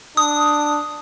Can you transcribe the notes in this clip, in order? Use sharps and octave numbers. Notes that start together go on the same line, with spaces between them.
D4 D#6